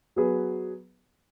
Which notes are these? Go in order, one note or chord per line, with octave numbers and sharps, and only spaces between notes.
F#3 B3 G#4 B4